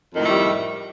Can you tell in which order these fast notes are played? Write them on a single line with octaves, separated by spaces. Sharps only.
F2 D#3 A2 A3 G3